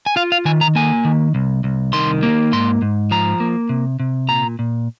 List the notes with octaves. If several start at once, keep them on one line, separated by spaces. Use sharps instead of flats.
G#5
F4 F5
F5
D#3 G#5
A#5
A#3 G#5
D#3
C2
C2
D#3 C6
A#3
G#2 C6
G#2
F3 A#5
A#3
C3
C3
A#2 A#5
A#2